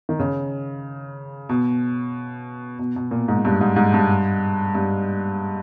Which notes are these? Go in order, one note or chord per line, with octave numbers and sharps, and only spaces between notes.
D#3
C#3
B2
B2
B2
A#2
G#2
G2
G#2
G#2
G2
G2